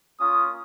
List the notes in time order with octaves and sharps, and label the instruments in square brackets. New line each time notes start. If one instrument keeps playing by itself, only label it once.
[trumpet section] A#3 C#4 F4 D#6